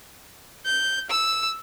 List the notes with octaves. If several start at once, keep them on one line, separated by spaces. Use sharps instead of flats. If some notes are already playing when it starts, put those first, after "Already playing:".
G6
E6